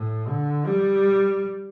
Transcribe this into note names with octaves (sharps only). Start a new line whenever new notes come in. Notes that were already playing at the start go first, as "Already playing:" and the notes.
Already playing: A2
D3
G3